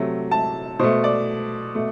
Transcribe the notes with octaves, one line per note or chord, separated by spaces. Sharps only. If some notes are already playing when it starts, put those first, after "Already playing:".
Already playing: C3 F#3 A3
A5
B2 A3 C5
D5
B2 A3